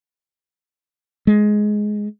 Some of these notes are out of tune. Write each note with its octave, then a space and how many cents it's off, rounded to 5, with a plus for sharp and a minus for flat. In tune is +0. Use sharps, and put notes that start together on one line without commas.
G#3 +10